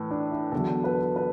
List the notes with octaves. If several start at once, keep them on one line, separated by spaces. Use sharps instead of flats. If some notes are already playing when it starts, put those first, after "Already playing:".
Already playing: A2 E3 A4 B4
D4
E4
E2 D3 F#3 A4
B4
B4